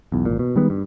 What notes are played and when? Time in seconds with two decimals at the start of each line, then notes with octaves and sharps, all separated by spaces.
0.12 B1 E2
0.25 G#1 A#2
0.39 B2
0.56 D#3 G3 G#3 B3
0.70 G2